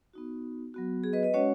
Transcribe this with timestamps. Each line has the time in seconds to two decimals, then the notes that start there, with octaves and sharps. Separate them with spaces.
0.14 B3 D#4 F#4
0.74 F#3 B3 F#4
1.04 G#4
1.13 B4 D#5
1.23 B4 D#5
1.33 G#3 C#4 F#4 C#5 F#5